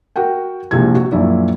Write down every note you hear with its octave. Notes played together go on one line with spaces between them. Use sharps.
F#4 A#4 F#5 G5
A#1 C3 E3 G#3 G#6
F#4
A#1 F#2 E4 D5